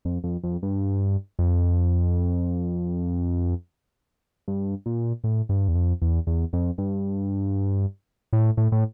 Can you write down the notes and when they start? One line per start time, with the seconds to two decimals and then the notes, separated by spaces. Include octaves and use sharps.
0.05 F2
0.24 F2
0.43 F2
0.63 G2
1.39 F2
4.48 G2
4.86 A#2
5.24 A2
5.49 G2
5.68 E2
5.75 F2
6.02 E2
6.27 E2
6.53 F2
6.78 G2
8.33 A2
8.57 A2
8.72 A2